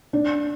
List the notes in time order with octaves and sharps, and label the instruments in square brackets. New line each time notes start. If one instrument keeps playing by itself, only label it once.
[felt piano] D4